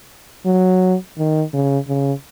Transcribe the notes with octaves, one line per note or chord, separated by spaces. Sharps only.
F#3
D#3
C#3
C#3